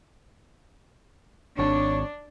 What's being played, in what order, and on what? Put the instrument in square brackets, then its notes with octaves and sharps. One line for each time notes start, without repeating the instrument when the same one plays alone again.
[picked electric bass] G#1 [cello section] D4 [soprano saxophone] C#5